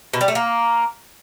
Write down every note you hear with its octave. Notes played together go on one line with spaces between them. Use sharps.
B2
G3
A3
A#3